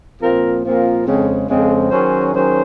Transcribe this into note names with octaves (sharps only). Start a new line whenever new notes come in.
A#2 F3 C4 F4 A#4
A#2 F3 C4 F4 A#4
F2 C#3 G#3 C4
F2 C#3 G#3 C4
D#3 F#3 C#4 G#4 C5
D#3 F#3 C#4 G#4 C5